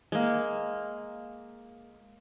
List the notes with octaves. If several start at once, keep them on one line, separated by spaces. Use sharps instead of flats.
G#3 A#3